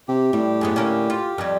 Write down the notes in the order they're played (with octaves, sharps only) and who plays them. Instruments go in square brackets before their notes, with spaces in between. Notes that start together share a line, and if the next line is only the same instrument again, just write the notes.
[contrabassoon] C3 [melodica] G4
[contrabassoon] A2 [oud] G3
[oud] F#2 G#3 B3
D3 A#3 C#4
F4
F2 G3